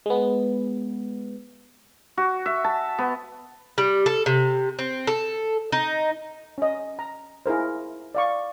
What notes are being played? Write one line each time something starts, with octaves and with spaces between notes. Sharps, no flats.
G#3 B3
F#4
E5
A5
B3
G3
A4
C3
C4
A4
D#4
C#4 D#5
A#5
E4 G#4 A#4 C5
D5 F5 C#6